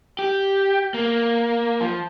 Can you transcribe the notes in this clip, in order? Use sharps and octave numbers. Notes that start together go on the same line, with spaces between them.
G4
A#3
F3